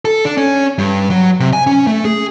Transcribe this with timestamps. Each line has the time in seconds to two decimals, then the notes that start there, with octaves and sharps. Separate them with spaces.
0.05 A4
0.25 D4
0.37 C#4
0.78 G2
1.10 F#3
1.40 C3
1.53 G#5
1.67 C#4
1.87 A3
2.05 G#4